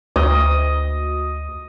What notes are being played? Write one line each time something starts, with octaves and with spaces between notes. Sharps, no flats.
D2 D#5